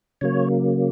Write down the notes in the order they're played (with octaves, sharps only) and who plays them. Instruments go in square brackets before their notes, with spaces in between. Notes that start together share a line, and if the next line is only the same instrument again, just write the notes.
[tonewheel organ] C#3 F#3 A#3 C#5